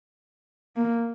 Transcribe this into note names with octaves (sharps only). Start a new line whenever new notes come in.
A#3